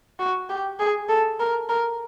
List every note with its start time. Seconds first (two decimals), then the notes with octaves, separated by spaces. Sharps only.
0.19 F#4
0.49 G4
0.79 G#4
1.09 A4
1.39 A#4
1.69 A#4